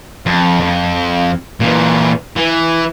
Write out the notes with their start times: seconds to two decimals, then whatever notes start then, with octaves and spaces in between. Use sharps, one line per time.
0.26 F2
0.60 F2
1.60 A#2 E3
2.36 E3